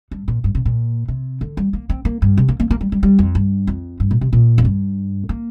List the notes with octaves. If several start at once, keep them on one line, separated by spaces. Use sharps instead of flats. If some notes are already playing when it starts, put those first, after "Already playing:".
G2
A#2
G2
C3
A#2
C3
D3
G3
A#3
C4
A#3
G2
C3
A#3
A#3
A#3
G3
G3
G3
F2
G2
F2
G2
A#2
C3
A#2
F2
G2
A#3